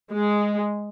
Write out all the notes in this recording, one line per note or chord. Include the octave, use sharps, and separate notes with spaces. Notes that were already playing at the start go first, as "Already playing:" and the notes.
G#3